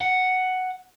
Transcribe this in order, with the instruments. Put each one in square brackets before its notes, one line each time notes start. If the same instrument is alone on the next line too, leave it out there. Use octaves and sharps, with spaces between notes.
[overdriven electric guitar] F#5